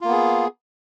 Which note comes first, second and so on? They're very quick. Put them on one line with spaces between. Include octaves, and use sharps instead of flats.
F4 A#3 B3 G#4